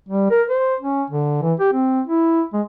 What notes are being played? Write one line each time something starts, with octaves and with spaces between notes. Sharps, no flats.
G3
A#4
C5
C#4
D3
E3
G4
C4
E4
G#3